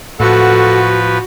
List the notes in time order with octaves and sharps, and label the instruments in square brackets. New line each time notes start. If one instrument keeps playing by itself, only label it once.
[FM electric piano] A2 C#6 [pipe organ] F3 B4 [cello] F#4 [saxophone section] A4 F#5